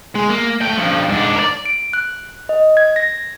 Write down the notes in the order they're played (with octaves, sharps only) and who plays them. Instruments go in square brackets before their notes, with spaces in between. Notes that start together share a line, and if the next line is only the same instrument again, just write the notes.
[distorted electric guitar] G#3
A#3
A2 G5
G2 F3
G#2 D4
A#4 D5
[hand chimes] D7
F#6
D#5
G#6
A#6